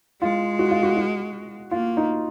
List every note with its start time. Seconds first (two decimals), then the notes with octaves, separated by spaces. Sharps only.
0.22 G#3 F4
0.59 F#4
0.71 F4
0.83 F#4
0.97 F#4
1.71 A#3 F4
1.97 D#4